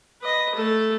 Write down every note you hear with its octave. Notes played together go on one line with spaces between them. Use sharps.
B4 D#5
A3 A4